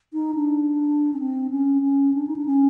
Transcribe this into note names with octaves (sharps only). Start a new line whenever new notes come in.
D#4
D4
C#4
C4
C#4
C#4
D4
D#4
D4
C#4